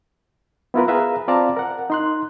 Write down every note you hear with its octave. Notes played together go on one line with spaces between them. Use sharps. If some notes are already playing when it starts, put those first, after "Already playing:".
B3 E4 F4 A#4 B4
G#4 B4 E5 F5 A#5
C4 F4 D5 F5 A5 A#5
A#4 F#5
D#4 C6 F#6